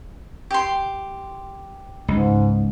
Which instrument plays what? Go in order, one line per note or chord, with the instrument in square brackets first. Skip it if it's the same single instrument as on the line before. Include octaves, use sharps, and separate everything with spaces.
[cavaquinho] G4 C6
[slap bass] C#2 [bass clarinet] G#2